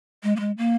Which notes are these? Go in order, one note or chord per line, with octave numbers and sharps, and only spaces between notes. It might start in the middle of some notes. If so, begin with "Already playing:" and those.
G#3
A#3
G#3
A#3